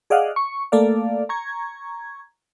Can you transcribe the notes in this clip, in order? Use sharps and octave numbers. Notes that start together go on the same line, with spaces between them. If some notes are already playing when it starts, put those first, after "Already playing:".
G#4 D5 D#5 F5 F#5
C#6
A3 A#3 A4 D5 F5
A#5 C#6 G#6